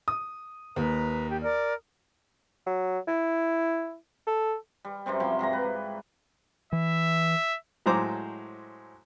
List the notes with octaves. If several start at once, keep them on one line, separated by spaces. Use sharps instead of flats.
D#6
D#2 B4 A#5
G4
A#4 D5 F6
F#3
E4
A4
G3
F#2 C3 G3 C4
C3 F3 F#3 E4
G#2 C3 G3 A#5
B4
E3 E5
A2 F#3 G#3 C5 A#5 D6